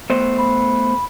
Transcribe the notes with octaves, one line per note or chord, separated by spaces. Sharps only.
A3 B3 C5
B5